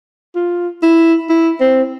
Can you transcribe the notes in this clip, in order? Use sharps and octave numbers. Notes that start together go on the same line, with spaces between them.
F4
E4
E4
C4